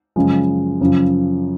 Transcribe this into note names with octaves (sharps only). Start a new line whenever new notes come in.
F#2 C#3 F3 G#3
F#2 C#3 F3